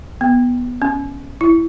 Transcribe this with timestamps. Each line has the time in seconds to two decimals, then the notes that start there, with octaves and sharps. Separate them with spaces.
0.21 B3
0.82 C#4
1.41 E4